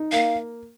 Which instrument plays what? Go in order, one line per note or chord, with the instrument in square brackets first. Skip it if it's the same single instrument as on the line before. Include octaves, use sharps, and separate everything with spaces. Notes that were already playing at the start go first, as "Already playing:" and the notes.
Already playing: [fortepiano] D#4
[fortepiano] A#3 [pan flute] F5